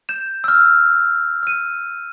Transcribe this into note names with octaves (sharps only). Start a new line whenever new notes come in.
G6 E7
E6 F6
F6 D#7